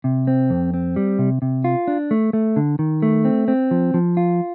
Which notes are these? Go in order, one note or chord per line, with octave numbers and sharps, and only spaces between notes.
C3
C4
F2
C4
G3
C3
C3
F4
D4
A3
A3
D3
D#3
A3
C4
C4
F3
F3
F4